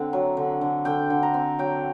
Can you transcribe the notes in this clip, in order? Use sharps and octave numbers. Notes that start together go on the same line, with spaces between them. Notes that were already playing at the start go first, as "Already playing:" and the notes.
Already playing: D3 C4 F#5
F#3
D3
D3
D3 G5
D3
A#5
C4
F#3 G5